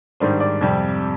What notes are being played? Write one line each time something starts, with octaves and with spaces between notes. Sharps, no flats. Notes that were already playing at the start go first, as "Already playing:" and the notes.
G#2 D#3 G3 D4 C5
D5
F2 C3 G3